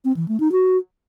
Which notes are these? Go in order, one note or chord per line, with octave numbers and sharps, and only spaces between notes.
C4
E3
A3
D#4
F#4